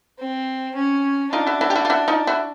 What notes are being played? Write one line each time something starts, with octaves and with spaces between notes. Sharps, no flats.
C4
C#4
D4 D#4 F4
E4 F#4
E4 F#4
G4
E4 F#4
F4
E4 F#4
D#4 F4
E4 F#4